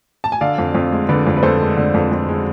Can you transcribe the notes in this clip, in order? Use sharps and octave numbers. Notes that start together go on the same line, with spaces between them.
A5
G#5
D3 D5 F5
F2
F2
G#3
D3 B4 D5
F2
B4
F2 A4 C5
G#3
D3
F2
F2
G#3